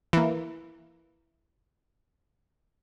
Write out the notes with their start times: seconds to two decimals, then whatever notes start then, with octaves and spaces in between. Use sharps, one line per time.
0.13 E3 A#3